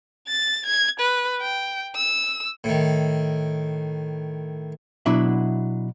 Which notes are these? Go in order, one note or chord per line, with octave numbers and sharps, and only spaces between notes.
A6
G#6
B4
G5
E6
A2 D#3
B2 F#3 D4 E4 E5